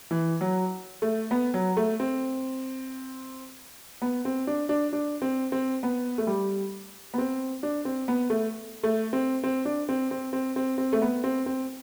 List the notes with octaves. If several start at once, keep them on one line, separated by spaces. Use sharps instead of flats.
E3
F#3
A3
B3
F#3
A3
C4
B3
C4
D4
D4
D4
C4
C4
B3
A3
G3
B3
C4
D4
C4
B3
A3
A3
C4
C4
D4
C4
C4
C4
C4
C4
A3
B3
C4
C4